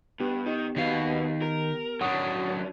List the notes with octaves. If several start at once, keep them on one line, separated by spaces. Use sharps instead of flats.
G2 B3 G4
D#3
B2 D#3 F5
A#4
F#2 F#3 D4 F#5 C#6 D#6